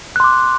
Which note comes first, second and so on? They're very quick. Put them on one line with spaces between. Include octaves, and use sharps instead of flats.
F#6 C6 D6